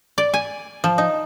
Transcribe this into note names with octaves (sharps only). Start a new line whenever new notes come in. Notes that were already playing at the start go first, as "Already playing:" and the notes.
D5
G#5
F3
D#4